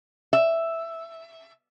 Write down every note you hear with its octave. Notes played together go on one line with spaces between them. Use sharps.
E5